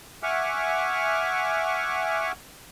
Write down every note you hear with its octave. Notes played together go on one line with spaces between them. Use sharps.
E5 F#5 G#5 C#6 D6 F6